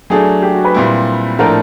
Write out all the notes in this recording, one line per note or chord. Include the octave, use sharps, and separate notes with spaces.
F#3 A3 D4 G#4
G4
F#4
B4
A#2 G3 C4 E4
A2 F3 A3 D4 A#4